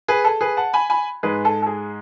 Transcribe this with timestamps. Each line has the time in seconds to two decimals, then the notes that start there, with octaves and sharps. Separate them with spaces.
0.08 G#4 B4
0.25 A4
0.41 G#4 B4
0.57 F#5 A5
0.73 G#5 B5
0.90 G#5 B5
1.23 G#2 G#3 G#4 B4
1.45 A4
1.62 A4
1.67 G#4